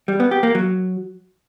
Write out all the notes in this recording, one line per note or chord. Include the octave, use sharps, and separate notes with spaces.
G3
B3
G4
A#3
F#3